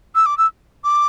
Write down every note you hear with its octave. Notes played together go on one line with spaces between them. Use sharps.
E6
D6
E6
D6